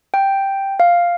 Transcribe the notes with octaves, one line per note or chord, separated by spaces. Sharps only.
G5
F5